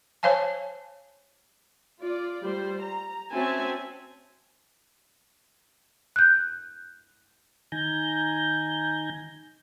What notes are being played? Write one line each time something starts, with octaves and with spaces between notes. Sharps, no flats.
C5 C#5 F5 G#5 A5
F4 D5
G3 C5
A#5
C4 C#4 F#4 E5 G#5 A5
F#6 G6
D#3 G#5 A#5 G6